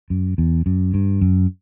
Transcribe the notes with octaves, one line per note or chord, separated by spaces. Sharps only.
F#2
E2
F#2
G2
F#2